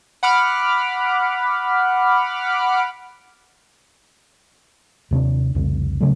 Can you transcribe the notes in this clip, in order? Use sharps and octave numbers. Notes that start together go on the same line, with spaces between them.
F#5 B5 D6 F6
D#2 C3 B3 D4
C2 F2 C#3
C#3 F#3 A3